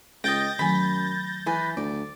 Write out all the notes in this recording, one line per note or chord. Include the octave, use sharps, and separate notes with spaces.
C#2 D#5 G5 G6 A6 A#6
F#2 D#3 F#3 A3 G#5 B5
E3 B4 G#5
D2 D5